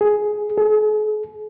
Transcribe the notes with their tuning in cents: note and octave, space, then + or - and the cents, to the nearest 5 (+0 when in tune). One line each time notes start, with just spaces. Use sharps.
G#4 +10
G#4 +45